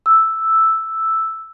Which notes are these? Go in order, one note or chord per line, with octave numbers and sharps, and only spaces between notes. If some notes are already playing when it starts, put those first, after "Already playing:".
E6